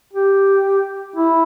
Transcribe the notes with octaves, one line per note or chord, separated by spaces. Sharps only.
G4
E4